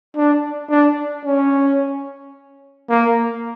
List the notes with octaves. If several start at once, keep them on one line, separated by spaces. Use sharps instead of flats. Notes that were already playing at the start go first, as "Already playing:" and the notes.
D4
D4
C#4
A#3